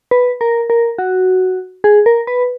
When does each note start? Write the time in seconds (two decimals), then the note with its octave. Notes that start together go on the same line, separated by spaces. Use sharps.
0.11 B4
0.41 A#4
0.70 A#4
0.98 F#4
1.84 G#4
2.06 A#4
2.27 B4